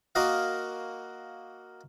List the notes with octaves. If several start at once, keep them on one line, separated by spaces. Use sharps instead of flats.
A#3 F#4 A#4 D#5 F5